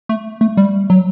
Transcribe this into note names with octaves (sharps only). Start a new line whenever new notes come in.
A3
A3
G3
F#3